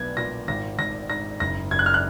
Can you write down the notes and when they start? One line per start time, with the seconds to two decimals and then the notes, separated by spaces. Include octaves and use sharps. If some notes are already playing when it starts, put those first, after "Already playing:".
Already playing: B1 B3 G#6
0.17 A#2 A#6
0.48 G#1 A#6
0.78 G#1 A#6
1.09 G#2 A#6
1.40 F#1 A#6
1.71 F#1 G#6
1.79 F#6
1.86 F6
1.94 F#6